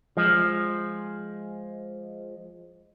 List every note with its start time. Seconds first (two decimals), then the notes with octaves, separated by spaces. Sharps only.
0.17 F3 G#3